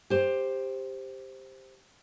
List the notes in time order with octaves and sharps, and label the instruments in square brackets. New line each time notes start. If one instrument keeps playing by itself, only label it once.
[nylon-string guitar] G4 C5